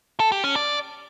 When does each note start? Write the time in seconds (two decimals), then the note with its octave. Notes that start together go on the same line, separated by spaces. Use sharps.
0.20 A4
0.32 G4
0.44 C#4
0.56 D5